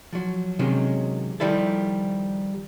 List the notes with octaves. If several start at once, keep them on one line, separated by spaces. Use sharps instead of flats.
F3 F#3
C3 D#3 F#3 G#3 C#4
D#3 F3 G3 E4 A4